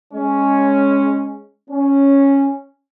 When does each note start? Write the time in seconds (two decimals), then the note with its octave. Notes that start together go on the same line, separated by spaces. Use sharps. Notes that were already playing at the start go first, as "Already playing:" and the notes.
0.14 G#3 C#4
1.70 C#4